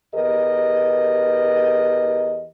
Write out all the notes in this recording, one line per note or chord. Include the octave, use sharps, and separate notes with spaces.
E2 G4 A#4 B4 D#5